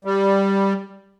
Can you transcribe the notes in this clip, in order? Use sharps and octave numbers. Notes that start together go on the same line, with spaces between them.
G3